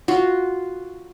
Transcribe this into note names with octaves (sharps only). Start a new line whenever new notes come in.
F4 F#4